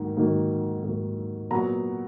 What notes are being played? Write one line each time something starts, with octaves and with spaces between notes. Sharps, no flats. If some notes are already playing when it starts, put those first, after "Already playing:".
Already playing: G#2 D#3 F#3 A#3 D#4
G#2 D#3 F#3 A#3 D#4
G#2 D#3 F#3 A#3 D#4
A#2 F#3 B3 A#5